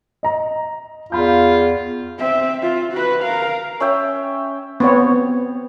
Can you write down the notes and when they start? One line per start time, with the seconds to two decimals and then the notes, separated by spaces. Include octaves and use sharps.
0.23 D#5 A#5
1.12 E2 F4 F5 B5 G6
2.19 C4 E5
2.62 F4
2.93 F#4 B4
3.23 A#4 F5
3.80 C#4 E5 G5
4.80 B3 C4 C#5